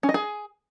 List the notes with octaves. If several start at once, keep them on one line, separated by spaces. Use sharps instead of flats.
C#4
D#5
G#4